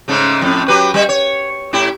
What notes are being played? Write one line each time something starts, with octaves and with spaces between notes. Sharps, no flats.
G#2 C#3 A3
F2 A2
F#3 G4 B4
G3 E5
C#5
A2 E4 G4